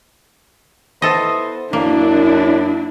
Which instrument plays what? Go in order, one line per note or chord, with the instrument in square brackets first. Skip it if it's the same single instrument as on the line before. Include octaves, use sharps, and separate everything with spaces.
[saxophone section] B3 E4 C5 [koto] A4 D#5
[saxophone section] F#2 [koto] A#3 [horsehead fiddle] D4 E4